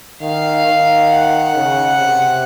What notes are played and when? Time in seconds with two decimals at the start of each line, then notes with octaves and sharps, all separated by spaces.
0.21 D#3 F5
0.66 D#3
1.10 F#5
1.55 C#3
1.99 C3